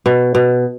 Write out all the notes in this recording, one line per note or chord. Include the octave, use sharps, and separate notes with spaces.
B2
B2